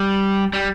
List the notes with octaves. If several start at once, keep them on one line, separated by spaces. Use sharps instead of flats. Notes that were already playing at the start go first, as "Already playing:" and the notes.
Already playing: G3
G3